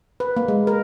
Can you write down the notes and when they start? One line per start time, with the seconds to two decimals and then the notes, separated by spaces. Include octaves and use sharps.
0.20 B4
0.37 A#3
0.48 G#3
0.67 A#4